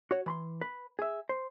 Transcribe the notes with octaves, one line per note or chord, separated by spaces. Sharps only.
F#4 C#5
E3 B5 C6
B4
G#4 E5
C5